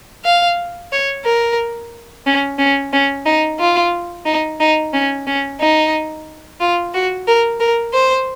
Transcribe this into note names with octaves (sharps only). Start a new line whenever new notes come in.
F5
C#5
A#4
C#4
C#4
C#4
D#4
F4
D#4
D#4
C#4
C#4
D#4
F4
F#4
A#4
A#4
C5